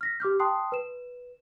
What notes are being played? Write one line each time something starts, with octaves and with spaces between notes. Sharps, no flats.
F6 A#6 B6
G4 D6 F6 G6
G5 A5 C6 D#6 F#6 C7
B4 E7